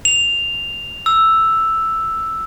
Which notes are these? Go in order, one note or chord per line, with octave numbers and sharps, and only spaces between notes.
F7
E6